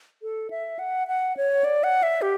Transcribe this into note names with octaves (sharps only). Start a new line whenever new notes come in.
A4
E5
F#5
F#5
C#5
D5
F#5
E5
G4